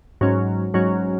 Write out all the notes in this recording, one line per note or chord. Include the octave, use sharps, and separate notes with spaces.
G#2 F#3 C#4
G#2 F#3 C#4